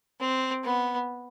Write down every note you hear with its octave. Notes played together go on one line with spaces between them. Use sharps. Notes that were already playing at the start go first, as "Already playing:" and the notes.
C4
B3